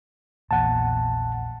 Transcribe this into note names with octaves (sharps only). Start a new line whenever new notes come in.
A#1 E2 A#2 F#5 A5